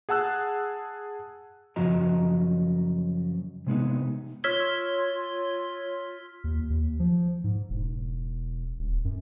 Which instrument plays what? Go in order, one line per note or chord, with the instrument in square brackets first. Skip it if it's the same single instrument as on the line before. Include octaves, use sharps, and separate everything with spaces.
[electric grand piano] G#4 F#5 A5 E6 F#6
[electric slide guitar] F#2 C#3 F3 F#4 D#5 A#5
C3 G#3 B3 D#4
[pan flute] F4 [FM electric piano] C#5 E6 G#6 [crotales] F6 B6 G7
[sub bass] D#2
D#2
F3
G#2
E1
D#1
F#2